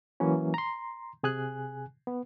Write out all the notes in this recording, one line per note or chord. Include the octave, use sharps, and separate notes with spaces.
E3 F#3 A#3 C#4
A#5 C6
C3 G#4 G#5 F#6
B3